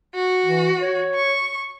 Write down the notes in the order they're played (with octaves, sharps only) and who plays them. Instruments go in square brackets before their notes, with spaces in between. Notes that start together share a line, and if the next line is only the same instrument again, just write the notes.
[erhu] F#4
[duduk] E3
C#5
[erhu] C#6